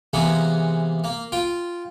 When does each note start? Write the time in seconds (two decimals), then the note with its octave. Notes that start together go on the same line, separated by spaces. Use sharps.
0.13 C3 E3 G#3 A#3 B3
1.04 A#3
1.32 F4 G5